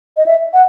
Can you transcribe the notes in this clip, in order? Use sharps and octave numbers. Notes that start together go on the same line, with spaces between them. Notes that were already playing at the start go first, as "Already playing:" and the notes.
D#5
E5
F#5